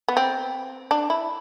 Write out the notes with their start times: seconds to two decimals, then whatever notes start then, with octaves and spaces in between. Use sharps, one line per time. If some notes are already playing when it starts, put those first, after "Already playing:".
0.08 B3
0.17 C4
0.91 D4
1.10 E4